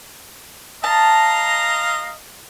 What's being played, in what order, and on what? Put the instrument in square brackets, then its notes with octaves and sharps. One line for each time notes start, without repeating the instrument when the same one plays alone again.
[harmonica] D#5 F5 A#5 [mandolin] A5